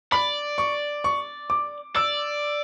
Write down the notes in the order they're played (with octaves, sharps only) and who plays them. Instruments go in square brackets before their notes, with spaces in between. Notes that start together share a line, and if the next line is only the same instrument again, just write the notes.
[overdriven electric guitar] D5 [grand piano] B5
[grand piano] C#6
C#6
D6
[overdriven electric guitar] D5 [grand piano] E6